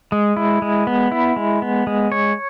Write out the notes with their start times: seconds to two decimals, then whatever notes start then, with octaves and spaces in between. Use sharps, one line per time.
0.12 G#3
0.37 E4
0.62 G#3
0.87 B3
1.12 E4
1.36 G#3
1.62 B3
1.87 G#3
2.12 C#5